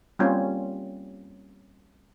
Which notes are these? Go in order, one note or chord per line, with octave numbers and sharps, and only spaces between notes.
G3 A#3 C4 C#4 F4